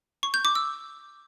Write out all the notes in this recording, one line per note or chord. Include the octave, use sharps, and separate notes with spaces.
C#6
G6
D6
E6